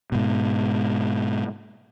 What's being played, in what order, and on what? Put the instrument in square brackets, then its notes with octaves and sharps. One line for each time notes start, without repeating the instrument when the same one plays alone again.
[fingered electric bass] G#2 B2